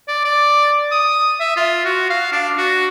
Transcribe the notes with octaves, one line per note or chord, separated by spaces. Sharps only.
D5
D5
D#6
E5
F4
F#4
F5
D4
F#4